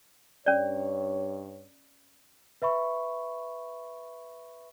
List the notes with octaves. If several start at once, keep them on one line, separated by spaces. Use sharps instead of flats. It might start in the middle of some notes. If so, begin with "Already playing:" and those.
G2 C#4 C#5 D5
B4 E5 B5 C#6